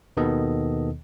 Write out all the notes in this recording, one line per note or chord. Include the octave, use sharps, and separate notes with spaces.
D#2 B2 D#3 B3 A4 D#5